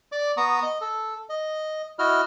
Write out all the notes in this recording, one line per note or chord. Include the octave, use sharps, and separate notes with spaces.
D5 D6
B3 A#5 C#6 D#6
D#5
A4
D#5
E4 F#4 D#5 F6